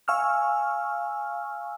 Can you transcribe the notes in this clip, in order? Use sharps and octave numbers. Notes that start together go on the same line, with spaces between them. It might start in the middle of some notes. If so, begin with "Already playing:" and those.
F5 G#5 C#6 E6 F6